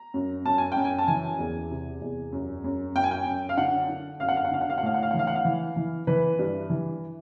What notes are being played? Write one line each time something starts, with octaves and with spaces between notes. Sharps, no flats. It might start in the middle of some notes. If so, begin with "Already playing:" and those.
Already playing: A#5
F#2
F#2 A5
G#5
F#2 G5
G#5
A5
E3 G#5
E2
C3
E2
F#2
F#2
F#2 G5
G#5
G5
F#2
F5
D3 F#5
D3
F#2 F5
F#5
F5
F#5
D3 F5
F#5
F5
F#5
A2 F5
F#5
F5
F#5
E3 F5
F#5
F5
E3
E3
E3 B4
G2
E3